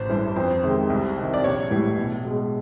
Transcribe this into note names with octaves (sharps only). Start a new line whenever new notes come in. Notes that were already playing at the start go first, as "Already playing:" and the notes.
Already playing: A1 C5
G2 E3
F2 C5
C3 D#3 G#3
C2
C3 D#3
D5
A#1 C#5
A2 E3 G3
B1
B2 G#3